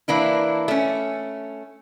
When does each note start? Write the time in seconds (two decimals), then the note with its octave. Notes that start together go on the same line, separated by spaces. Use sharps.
0.08 E3 A#3 D4 E4
0.68 A3 C#4